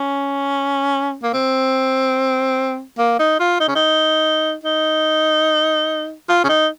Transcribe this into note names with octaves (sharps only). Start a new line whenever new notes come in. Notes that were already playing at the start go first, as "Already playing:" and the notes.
Already playing: C#4
A#3
C4
A#3
D#4
F4
D#4
C#4
D#4
D#4
F4
C#4
D#4